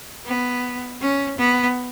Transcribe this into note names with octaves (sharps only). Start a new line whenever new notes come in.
B3
C#4
B3